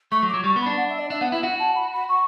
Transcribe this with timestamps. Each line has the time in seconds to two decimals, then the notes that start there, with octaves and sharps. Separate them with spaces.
0.11 A3 C#6
0.23 F#3
0.29 D6
0.34 F#3
0.44 G3 C#6
0.56 B3
0.61 B5
0.66 D4
0.77 F#5
0.89 E5
0.99 D5
1.10 D4 E5
1.21 B3 F#5
1.32 E4 E5
1.43 F#4 F#5
1.59 A5
1.75 B5
1.92 B5
2.09 C#6